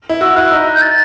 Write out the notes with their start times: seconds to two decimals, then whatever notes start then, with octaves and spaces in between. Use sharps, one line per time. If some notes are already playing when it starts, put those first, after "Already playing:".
0.09 E4
0.21 F#4 E6
0.36 E4 F#6
0.52 D#4
0.75 G6
0.82 A6